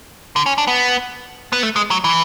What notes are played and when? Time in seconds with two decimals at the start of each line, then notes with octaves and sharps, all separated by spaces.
0.36 D3
0.46 C#4
0.58 D4
0.67 B3
1.53 B3
1.63 A3
1.76 G#3
1.91 F#3
2.04 E3